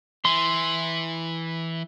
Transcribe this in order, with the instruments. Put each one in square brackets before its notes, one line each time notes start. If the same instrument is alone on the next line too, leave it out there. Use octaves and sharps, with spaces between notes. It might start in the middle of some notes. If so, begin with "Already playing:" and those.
[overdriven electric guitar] E3 [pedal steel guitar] C6